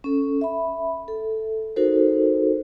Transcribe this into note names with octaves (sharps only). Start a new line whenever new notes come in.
C#4 A4
E5 B5
A4
D#4 F#4 A4 A#4 C5